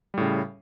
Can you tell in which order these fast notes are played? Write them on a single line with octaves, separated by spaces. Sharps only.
G3 A2 C#3